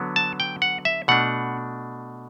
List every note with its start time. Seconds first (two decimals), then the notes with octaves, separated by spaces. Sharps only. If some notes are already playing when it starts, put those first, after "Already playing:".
Already playing: D3 F#3 B3
0.16 A5
0.40 G5
0.62 F#5
0.85 E5
1.08 B2 A3 D4 F#5